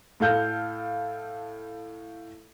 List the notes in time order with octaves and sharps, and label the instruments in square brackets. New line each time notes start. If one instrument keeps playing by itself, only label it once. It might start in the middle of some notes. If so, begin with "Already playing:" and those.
[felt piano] A2 A4 F5 G6